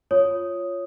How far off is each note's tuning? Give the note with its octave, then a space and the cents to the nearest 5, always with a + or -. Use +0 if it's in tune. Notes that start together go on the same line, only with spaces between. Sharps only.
F4 +0 C#5 +0 D#6 +0